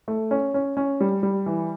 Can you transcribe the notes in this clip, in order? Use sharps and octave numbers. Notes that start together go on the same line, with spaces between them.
A3
C#4
C#4
C#4
G3
G3
E3